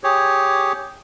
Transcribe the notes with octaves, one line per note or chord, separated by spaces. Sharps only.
G4 G#4 C#5